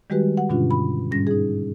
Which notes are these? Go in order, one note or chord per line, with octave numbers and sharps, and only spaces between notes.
D#3 G3 G#3 F#4 G4 B4
F#5
G2 B2 D3 C#4 D4 F4
B5
G#2 G3 C#4 A#6
D#4 G#4